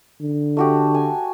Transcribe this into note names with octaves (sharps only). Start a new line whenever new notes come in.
D3
A3 F#4 G4
G#5